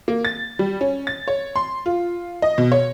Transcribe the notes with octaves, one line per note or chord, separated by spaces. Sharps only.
A#3
A6
G3
C#4
A6
C#5
C6
F4
D#5
B2
C#5